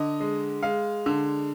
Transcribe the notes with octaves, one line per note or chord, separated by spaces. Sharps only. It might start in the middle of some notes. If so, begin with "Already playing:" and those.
Already playing: D3 D#5
G#3
G#3 F5
D3